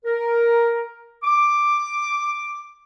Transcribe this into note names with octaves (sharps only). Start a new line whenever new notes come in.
A#4
D6